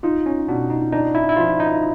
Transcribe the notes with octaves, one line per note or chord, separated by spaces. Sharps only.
D#4 F4
C#4
B2 D4
D#4
D4 D#4
E4
E4
F3 F4
D#4